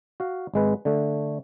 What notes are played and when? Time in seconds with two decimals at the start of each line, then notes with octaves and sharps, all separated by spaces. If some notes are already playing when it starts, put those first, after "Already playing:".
0.20 F#4 F5
0.54 G#1 G#3 B4
0.85 D3 A3